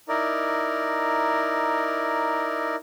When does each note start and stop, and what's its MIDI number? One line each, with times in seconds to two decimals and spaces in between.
0.09 2.76 63
0.09 2.76 64
0.09 2.76 70
0.09 2.76 74